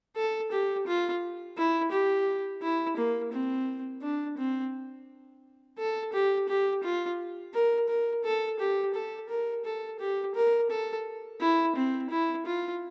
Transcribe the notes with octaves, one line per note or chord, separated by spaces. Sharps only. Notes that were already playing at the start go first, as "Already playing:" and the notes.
A4
G4
F4
E4
G4
E4
A#3
C4
D4
C4
A4
G4
G4
F4
A#4
A#4
A4
G4
A4
A#4
A4
G4
A#4
A4
E4
C4
E4
F4